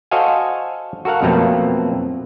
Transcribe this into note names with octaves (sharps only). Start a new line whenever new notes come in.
F#4 A4 C5 D#5 F5 G#5
F#4 A4 A#4 F5 F#5
F2 B2 F#3 A3 A#3 C4